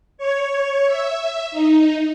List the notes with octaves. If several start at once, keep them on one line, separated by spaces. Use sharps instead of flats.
C#5
E5
D#4